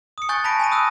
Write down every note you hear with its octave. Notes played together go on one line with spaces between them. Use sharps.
D#6 C#7
G#5 C#6 F#6 G6 A6
A5 B5 A#6 B6 D7
G#5 B5 A#6 D#7
D#6 E6 F#6